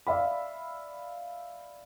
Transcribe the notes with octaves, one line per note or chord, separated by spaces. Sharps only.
D5 E5 F5 B5